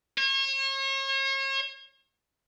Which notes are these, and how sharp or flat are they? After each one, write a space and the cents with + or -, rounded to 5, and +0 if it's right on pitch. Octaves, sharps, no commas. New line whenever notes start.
C#5 -40